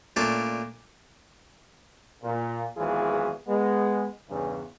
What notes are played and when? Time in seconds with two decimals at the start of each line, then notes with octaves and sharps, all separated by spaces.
0.16 A#2 A3 C#4 D4 F4 D6
2.23 A#2
2.76 G#1 E2 E3 F#3 F4 G#4
3.47 G#3 B3
4.29 E2 G2 C#3